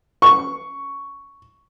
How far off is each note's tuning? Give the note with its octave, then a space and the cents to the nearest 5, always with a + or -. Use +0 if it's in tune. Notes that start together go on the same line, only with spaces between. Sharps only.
C#6 +5